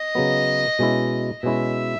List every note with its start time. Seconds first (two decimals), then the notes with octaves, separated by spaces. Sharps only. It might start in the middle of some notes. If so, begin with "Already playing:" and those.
Already playing: D#5
0.15 C#3 F#3 B3
0.79 B2 G#3 C#4 E4
1.43 B2 G#3 C#4 E4 E5